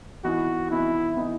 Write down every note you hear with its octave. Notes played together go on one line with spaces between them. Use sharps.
E3 B3 D#4 F#4
E3 B3 D#4 E4
E3 B3 D#4